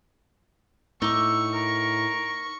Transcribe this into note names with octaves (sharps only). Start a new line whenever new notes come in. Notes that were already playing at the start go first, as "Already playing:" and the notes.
A2 D#4 C#6 D6 E6
A#4